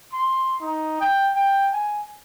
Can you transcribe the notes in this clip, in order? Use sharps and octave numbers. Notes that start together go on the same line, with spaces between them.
C6
D#4
G5
G5
G#5